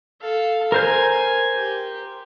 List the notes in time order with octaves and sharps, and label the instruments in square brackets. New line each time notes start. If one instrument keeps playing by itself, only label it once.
[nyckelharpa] A4 F5
[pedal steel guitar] A#4 C5 G6 [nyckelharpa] G#5
[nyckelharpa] G4